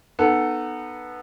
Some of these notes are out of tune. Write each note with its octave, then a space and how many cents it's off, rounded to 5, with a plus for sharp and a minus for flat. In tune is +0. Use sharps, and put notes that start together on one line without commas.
B3 -5 D#4 -25 A4 +0